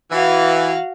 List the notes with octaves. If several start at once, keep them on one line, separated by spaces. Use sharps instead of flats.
E3 F#4 F5